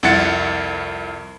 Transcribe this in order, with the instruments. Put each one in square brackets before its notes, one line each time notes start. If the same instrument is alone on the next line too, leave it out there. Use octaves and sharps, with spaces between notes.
[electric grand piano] C2 F2 E4 F#5 A6 C#7